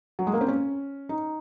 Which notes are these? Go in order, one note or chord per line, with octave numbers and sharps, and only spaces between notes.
F#3
G#3
A#3
C4
C#4
D#4